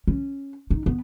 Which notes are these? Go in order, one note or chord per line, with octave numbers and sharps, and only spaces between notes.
C#4
D#4
B3